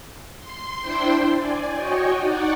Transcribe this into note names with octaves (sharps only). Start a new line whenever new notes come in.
C6
D4 E4 C5 G5 C6
D5 G#5
F#4 C#5 D#5 G5 G#5 C#6
D#4 D5 F#5